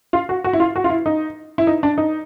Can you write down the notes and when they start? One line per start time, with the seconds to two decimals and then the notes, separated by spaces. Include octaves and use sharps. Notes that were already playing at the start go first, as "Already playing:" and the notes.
0.13 F4
0.29 F#4
0.44 F#4
0.53 E4
0.60 F4
0.76 F#4
0.84 F4
0.90 E4
1.06 D#4
1.58 E4
1.67 D#4
1.83 D4
1.98 D#4